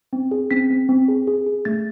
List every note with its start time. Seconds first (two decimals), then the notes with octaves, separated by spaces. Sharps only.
0.13 C4
0.31 G#4
0.51 C4 B6
0.70 C4
0.89 C4
1.08 G#4
1.27 G#4
1.46 G#4
1.65 A3 A6